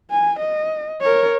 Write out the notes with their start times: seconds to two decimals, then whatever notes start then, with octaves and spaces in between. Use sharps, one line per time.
0.10 G#5
0.40 D#5
1.01 A#4 C#5